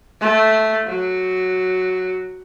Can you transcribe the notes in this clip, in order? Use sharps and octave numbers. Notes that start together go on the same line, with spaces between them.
A3
F#3